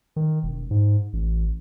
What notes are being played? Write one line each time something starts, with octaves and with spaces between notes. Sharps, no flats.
D#3
E1
G#2
A1